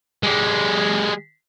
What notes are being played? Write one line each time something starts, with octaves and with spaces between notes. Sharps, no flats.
G#3 G4